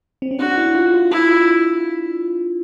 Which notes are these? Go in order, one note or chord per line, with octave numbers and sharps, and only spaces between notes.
C4
C#4
D4 F#4
E4
F4
F4
E4 F4